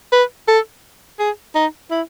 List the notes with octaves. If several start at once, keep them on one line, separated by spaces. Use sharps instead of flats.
B4
A4
G#4
D#4
E4